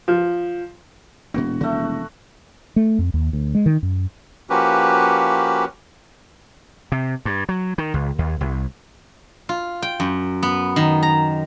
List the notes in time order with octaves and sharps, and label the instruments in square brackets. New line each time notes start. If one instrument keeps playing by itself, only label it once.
[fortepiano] F3
[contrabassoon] E1 [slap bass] A#2 A#3 C4 [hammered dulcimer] F#4
[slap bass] C3 F3 C#4 [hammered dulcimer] A3 F#4
[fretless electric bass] A3
F2
D#2
D2
G#3
D#3
F#2
[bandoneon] F3 A#3 C#4 F#4 G4 B4
[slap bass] C3
G2
F#3
D#3
C#2
D#2
C2
[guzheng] F4
G5
F#2
B3
D#3
A#5